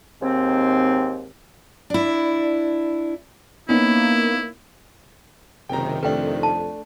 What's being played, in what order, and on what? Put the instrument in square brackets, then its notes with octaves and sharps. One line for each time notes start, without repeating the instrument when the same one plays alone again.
[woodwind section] D#2 G#2 C4
[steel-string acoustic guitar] D4 E4
[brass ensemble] A#3 [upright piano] B3 C#4 D#4 [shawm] E4
[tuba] F#1 [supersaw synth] C3 D#3 [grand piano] G5 A#5
[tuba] F2 [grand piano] A3 D4 [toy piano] B4 G5
[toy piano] A5